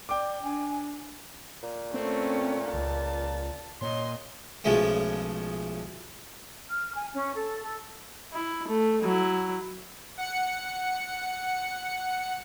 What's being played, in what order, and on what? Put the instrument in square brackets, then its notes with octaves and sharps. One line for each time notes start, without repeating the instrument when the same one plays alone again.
[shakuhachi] D5 [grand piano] G5 D6
[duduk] D4 [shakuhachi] G#5
[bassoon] A#2
[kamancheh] A3 C#4 [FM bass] C4
[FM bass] C#2 [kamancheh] A5
[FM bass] A#2 [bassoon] C#4 [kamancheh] D#5 C6
[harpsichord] B1 C#3 F3 G#3 A3
[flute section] F6
G#5
C#4
A4
A4
[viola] E4
A3
F#3 E4
[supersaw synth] F#5 C#7